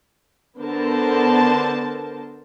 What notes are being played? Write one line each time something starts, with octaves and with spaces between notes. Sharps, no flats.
D3 B3 A#4 C5 A5